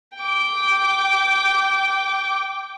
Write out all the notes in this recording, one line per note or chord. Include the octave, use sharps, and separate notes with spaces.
G5 D6